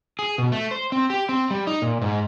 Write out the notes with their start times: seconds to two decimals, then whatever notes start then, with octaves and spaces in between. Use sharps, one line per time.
0.19 G#4
0.38 B2
0.52 A3
0.71 C5
0.92 C4
1.10 G4
1.29 C4
1.51 G3
1.67 D#4
1.82 A#2
2.02 G#2